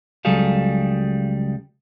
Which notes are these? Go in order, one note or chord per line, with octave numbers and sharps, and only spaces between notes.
C#2 F#3 G3 G#4 A4 F5